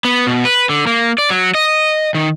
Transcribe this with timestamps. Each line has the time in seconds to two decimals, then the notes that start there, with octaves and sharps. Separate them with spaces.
0.05 B3
0.27 B2
0.45 B4
0.69 D3
0.87 A#3
1.18 D5
1.30 F#3
1.55 D#5
2.15 D#3